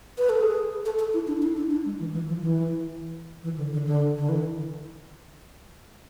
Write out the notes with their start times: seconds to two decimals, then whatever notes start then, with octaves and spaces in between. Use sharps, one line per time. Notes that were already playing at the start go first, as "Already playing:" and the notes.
0.18 B4
0.29 A4
0.41 G#4
0.85 A4
0.99 A4
1.13 E4
1.27 D4
1.42 E4
1.57 D4
1.71 D4
1.85 G#3
2.00 E3
2.14 E3
2.28 F3
2.42 E3
3.43 E3
3.57 D3
3.72 D3
3.86 D3
4.18 D3
4.29 E3